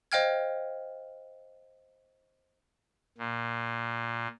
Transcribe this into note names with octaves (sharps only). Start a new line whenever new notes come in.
C5 D#5 F5 G5 F6 G#6
A#2